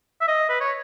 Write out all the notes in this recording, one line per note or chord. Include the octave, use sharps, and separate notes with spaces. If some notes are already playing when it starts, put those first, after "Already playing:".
E5
D#5
B4
C#5